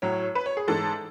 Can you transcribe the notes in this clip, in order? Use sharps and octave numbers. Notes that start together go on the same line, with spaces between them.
A2 F#3 C#5
B4
C#5
G#4
G#2 E3 G#3 A4